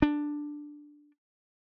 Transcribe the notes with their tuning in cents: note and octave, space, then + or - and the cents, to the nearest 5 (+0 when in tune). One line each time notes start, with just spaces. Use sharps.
D4 +5